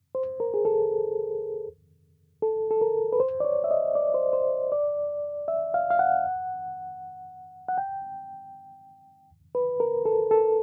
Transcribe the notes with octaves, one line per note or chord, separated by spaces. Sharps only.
C5
A#4
G#4
A4
A4
A4
A#4
B4
C5
D5
C#5
E5
D#5
D5
C5
C5
D5
E5
F5
F5
F#5
F#5
G5
B4
A#4
A4
A4